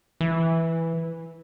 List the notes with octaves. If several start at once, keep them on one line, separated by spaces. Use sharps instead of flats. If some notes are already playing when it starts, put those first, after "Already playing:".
E3